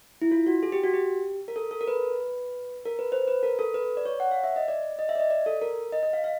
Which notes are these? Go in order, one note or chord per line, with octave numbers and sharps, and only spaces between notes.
E4
F4
F#4
G#4
G4
F#4
G4
A#4
A4
A4
A#4
B4
A#4
B4
C5
B4
A#4
A4
B4
D5
C#5
F#5
F5
E5
D#5
D5
D#5
E5
D5
D#5
D5
A4
A#4
D#5
D#5
F5
F5